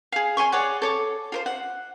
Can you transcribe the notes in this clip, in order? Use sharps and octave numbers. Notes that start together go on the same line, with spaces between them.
G#4 F5
C#5 G#5 C6 C#6
G#4 C#5 D5 F#5
A4 C#5 D6
F4 A#4 C5
F#5